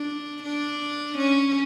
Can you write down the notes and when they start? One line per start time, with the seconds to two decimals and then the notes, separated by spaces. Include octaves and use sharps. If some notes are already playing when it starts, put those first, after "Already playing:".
Already playing: D4
0.42 D4
1.17 C#4